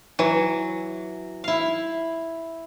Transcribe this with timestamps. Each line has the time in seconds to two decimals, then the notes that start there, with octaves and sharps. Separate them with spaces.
0.19 E3 F#3
1.44 E4 F5